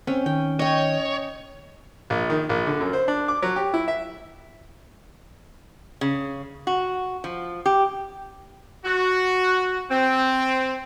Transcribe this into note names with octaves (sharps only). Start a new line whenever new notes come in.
C4 C#4 G5
D#3 G5
C#5 D#5 G5
A#1
D#3
A#1
D3
F#2
C5
D4
D6
F#3
G4
E4
E5
C#3
F#4
F3
G4
F#4
C4